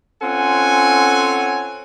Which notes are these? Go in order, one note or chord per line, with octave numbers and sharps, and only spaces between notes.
C4 C#4 F4 A4 F#5 G#5